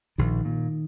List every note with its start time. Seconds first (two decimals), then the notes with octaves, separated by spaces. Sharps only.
0.18 A#1 D#3
0.45 A#2